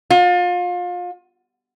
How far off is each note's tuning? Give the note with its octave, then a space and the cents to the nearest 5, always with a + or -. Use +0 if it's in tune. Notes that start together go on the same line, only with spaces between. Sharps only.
F4 +30